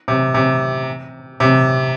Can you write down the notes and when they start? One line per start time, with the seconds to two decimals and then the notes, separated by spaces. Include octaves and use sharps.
0.08 C3
0.34 C3
1.40 C3